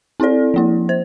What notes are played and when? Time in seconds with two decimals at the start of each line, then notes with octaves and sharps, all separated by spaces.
0.20 C4 E4 A4 D5
0.54 F3 A#3 E4
0.89 C5